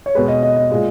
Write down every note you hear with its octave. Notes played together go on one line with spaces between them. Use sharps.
C#5
B2 G#3 B4
D#5
D#5
D#5
A#2 G#3